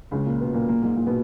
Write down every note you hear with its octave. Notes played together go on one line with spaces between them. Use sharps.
C#2 C#3
A#2 A#3
B2 B3
A#2 A#3
A#2 A#3
G#2 G#3
A#2 A#3
B2 B3